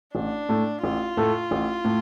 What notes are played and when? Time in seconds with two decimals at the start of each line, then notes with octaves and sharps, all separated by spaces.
0.15 A1 D4
0.49 A2 A3
0.83 A1 F4
1.17 A2 A3
1.51 A1
1.85 A2